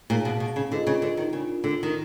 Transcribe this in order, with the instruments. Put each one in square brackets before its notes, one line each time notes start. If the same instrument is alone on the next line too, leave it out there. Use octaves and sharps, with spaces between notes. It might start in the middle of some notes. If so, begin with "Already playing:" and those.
[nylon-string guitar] A#2 [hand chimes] D#4 G#4 C#5 F5 A5
[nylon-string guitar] B2
B2
C#3
[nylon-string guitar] D3 [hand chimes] D4 F4 G#4 B4 D#5
[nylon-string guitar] C#3
D3
D#3
[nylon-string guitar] C#3 [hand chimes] D4 F4 A#4
[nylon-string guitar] D3
D#3